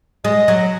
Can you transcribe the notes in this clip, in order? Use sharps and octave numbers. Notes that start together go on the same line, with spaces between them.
G#3 D#5
F#3